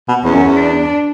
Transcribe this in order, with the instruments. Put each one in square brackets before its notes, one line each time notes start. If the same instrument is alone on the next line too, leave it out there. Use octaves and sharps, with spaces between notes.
[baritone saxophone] B2
[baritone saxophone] E2 [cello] C#4
[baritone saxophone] F#2
E2
[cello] D4